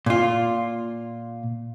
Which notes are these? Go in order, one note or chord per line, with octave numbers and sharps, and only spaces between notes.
A#2 F4